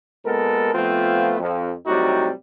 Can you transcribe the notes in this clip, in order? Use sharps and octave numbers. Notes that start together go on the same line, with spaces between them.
A#2 G#3 B3 A4 A#4
F3 A3 B3 C4 F4
F2
A2 C3 F#3 G3 D#4 F#4